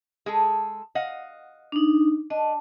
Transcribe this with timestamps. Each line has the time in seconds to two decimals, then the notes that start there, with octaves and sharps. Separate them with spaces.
0.26 G#3 G#4 A4
0.95 D#5 F5 F#5
1.72 D4 D#4
2.30 D4 D#5